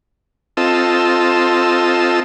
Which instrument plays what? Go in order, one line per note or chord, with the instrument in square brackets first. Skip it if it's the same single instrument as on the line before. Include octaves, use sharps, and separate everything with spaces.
[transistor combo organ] C4 F4 A4 D#5 E6